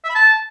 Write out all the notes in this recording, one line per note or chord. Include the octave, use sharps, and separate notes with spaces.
E5
B5
A5